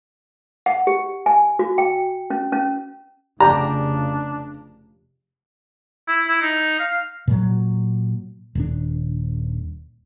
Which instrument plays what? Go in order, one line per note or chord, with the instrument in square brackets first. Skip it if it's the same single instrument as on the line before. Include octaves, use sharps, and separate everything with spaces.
[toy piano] F#5
G4
G#5
F#4
G5
C#4
C#4
[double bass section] F1 C#3 [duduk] D4 [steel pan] G4 D5 G5 [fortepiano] A#5
[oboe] E4
E4
D#4
F5
[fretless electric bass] A#2 F#3
D#1 D4